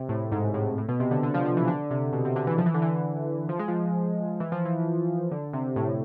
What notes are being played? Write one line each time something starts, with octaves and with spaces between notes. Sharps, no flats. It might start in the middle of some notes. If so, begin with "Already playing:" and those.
Already playing: C3
A2
G#2
A2
A2
B2
C3
D3
D3
F3
F3
E3
D3
C3
B2
C3
D3
E3
F3
E3
D3
E3
F3
G#3
F3
E3
F3
E3
D3
C3
A2